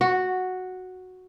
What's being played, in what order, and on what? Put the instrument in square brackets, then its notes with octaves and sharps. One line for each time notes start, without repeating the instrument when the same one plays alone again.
[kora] F#4